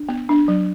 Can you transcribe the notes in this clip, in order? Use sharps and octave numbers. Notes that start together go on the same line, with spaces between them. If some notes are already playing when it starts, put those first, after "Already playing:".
Already playing: D4
B3
D4
F#3